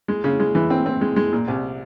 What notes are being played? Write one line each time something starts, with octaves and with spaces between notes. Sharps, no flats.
G#3
C#3
G#3
E3
C4
C4
G#3
G#3
A#2
C2